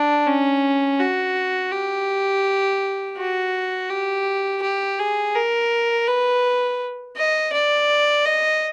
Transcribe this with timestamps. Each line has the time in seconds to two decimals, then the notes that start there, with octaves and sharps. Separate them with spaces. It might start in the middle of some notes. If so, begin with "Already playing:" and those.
Already playing: D4
0.27 C#4
1.00 F#4
1.72 G4
3.17 F#4
3.90 G4
4.62 G4
4.99 G#4
5.35 A#4
6.07 B4
7.17 D#5
7.53 D5
8.25 D#5